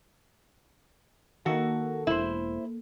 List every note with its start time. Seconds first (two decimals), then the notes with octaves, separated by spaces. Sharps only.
1.46 D#3 A#3 F#4 A4
2.07 E1 E4 C5